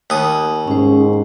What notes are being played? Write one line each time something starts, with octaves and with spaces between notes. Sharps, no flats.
D#2 D#6
G#2 C#4 C5